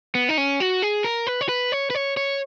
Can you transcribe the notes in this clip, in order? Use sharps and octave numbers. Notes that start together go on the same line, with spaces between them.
B3
D#4
C#4
F#4
G#4
A#4
B4
C#5
B4
C#5
B4
C#5
C#5